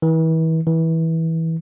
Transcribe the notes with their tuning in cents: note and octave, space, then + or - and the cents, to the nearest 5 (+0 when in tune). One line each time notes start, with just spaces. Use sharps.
E3 -35
E3 -20